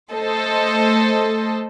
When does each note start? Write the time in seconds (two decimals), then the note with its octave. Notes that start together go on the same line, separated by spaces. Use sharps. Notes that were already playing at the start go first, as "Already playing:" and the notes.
0.12 A3 A4 C5 D#5